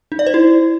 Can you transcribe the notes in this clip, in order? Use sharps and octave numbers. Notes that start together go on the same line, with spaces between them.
D#4
D5
C5
E4